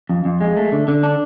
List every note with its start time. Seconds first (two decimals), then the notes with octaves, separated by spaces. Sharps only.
0.09 F2
0.25 F2
0.41 G#3
0.57 A3
0.72 D3
0.88 D3
1.03 D4